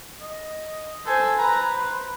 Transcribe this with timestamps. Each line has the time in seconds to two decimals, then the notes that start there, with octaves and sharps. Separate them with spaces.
0.21 D#5
1.06 A4 C5 G#5
1.38 B4 A#5
1.73 C5